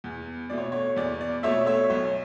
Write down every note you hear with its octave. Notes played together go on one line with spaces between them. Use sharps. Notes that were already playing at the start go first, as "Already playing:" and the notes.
E2
B2 A3 D5
C#5
C#5
E2 D5
D5
B2 A3 C#5 E5
C#5 E5
B1 C#5